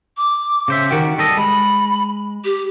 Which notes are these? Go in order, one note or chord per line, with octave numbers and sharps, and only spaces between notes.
D6
C#3 C5 E5
D#3 F#4 G4 A#4
G3 A4 D#5
G#3 B5
G4